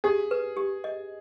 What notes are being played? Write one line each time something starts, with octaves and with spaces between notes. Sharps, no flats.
G4 G#4
B4
G4
D#5